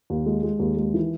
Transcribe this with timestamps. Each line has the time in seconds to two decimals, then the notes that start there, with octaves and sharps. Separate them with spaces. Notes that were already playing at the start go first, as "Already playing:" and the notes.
0.10 D#2
0.26 G#3
0.43 G#3
0.60 D#2
0.77 G#3
0.94 E3